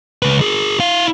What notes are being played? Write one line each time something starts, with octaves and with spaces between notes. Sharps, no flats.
C#2 B4
G#4 A#4
E4 F5